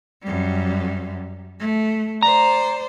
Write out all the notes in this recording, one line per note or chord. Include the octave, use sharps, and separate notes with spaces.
F#2 G3
A3
C5 D5 A#5